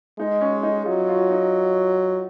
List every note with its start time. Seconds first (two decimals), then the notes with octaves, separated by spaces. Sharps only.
0.18 G#3 D#4
0.41 C#4
0.63 D#4
0.86 F#3 F4
1.09 F4
1.30 D#4